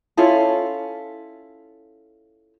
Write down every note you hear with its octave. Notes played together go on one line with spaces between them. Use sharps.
C#4 E4 F4 A4